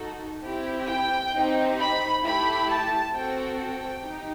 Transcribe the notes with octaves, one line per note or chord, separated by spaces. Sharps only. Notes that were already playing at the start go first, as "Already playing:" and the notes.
Already playing: D#4 F#4 A4
C4 E4 G4
G5
C4 D#4 G4
B5
A3 E4 G4 B5
A5
C4 F#4 A4 G5
G5
D#4 G4